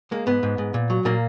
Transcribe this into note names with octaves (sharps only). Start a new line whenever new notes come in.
G#3 A#3
G#2 B3
G#2
G#2
A#2
F#3
A#2 A#3